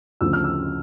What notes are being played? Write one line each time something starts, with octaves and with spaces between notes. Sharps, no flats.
D2 C#3 F3 E6
F6
E6